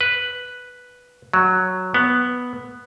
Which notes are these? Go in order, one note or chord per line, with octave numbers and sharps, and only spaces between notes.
B4
F#3
B3